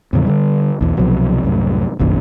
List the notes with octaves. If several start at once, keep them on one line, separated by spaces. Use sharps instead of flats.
E2 A2 C#3 F3
D3 D#3 G3
B1 E2
C2 B2 F3 F#3
C2 F#2 A2
F1 A#1 F#2 D#3